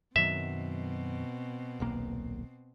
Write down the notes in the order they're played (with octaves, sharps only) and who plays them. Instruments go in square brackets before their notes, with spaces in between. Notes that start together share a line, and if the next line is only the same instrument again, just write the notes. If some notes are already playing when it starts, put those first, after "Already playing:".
[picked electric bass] F#2 D#3 F#3 [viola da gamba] B2 C4 [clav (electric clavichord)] E5
[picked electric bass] D#1 B1 A#3